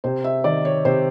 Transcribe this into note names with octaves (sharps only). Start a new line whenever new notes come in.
C3 C5
E5
D#3 D5
C#5
C3 C5